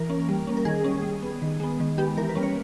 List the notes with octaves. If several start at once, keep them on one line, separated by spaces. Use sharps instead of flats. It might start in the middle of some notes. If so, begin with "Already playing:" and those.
Already playing: E3 A#4
A#3 C#4
G3
A#3 C#4
A#4
D#3 G#4
G3 C#4
G3
B3
D#3
G#3 B3
D#3
G#3 B3 G4
E3 A#4
B4
G3 A#3 C#4
C#5